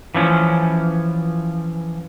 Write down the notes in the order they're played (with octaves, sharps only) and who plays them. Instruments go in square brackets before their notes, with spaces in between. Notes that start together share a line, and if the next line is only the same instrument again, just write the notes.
[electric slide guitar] E3 F3 C#4